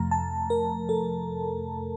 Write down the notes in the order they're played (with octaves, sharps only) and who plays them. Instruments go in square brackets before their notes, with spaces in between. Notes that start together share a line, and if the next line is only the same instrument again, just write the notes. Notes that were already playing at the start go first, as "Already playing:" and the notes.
Already playing: [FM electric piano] F2 C3 F3 A3 A#5
A5
A#4
A4